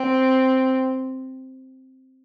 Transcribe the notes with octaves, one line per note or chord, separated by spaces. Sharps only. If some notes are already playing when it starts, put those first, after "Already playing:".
Already playing: C4